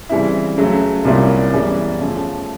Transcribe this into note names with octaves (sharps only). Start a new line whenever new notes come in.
C#3 E3 G3 C4 E4
C#2 C#3 F#3 A3
C2 A#2 G3 A#3 C#4
F#2 C#3 E3 G3 B3
C#3 F3 A3 C#4